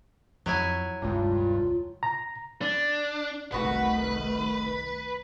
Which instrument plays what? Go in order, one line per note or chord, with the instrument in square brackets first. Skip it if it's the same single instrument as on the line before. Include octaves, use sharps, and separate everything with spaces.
[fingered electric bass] F2 [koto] F#3 E4 G#5
[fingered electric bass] E1 C#2 G#3 [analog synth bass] G2 [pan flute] F4
[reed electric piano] A#5
[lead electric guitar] D4
[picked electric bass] F#1 [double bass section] C2 D#3 A3 [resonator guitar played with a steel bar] B3 F#4 F#5 [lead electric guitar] B4